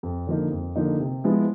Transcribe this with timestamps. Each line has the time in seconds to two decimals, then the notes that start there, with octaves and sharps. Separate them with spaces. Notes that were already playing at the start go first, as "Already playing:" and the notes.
0.03 F2
0.27 D3 F3 A#3 D#4
0.52 F2
0.76 D3 F3 A#3 D#4
1.00 C3
1.24 F3 G#3 B3 E4